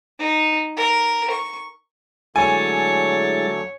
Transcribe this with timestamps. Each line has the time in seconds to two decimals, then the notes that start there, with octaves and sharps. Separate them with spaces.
0.19 D#4
0.76 A#4
1.30 C#6
2.36 D3 F#3 G#3 A3 E4 C#5 G#5 A6